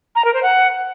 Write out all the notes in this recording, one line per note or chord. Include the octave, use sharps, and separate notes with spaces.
A#5
A#4
C5
F#5